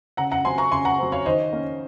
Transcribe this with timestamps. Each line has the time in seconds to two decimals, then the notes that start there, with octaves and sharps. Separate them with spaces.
0.17 C#3 F#5 A#5
0.31 F#5 A#5
0.44 F#3 C4 G#5 C6
0.58 A#5 C#6
0.71 C#3 G#5 C6
0.85 F#5 A#5
0.99 F#3 C4
1.12 C#5 F5
1.26 D#3 C5 D#5
1.53 A#3 C#4